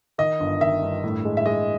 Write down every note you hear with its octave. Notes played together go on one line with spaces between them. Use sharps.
D#3 D#5
G1
D#3 E5
G2
A2
G#3
E5
G#3 D#5